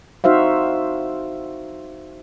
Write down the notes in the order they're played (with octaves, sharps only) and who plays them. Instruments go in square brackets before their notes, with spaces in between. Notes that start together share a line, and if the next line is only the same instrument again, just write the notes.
[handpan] D#4 F#4 C5 E5 F5